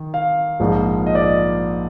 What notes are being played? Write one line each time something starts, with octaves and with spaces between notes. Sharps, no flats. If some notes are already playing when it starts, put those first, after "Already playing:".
Already playing: D#3
F5
A#1 G#2 F3
D#5
D5
D#5